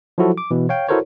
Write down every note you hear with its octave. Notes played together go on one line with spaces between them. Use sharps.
F3 F#3 E4 F#4 A4
D6
B2 E3
C#5 F5 G5
E4 F#4 A4 A#4 C5 C#5